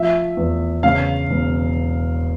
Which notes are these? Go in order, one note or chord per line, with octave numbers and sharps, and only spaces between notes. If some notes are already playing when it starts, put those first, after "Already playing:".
Already playing: F3 E5
E2
C#3 F5
E1